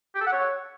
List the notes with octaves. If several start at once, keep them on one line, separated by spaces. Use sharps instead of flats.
G4
A4
F#5
C#5